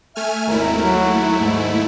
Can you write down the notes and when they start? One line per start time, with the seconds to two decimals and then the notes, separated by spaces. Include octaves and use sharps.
0.16 A3 E5 G#5 F6
0.47 G#1 D#2 A3 E4 A#4
0.83 F#3
1.40 G#2